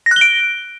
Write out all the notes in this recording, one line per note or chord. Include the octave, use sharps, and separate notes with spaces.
A#6
F#6
G7
D7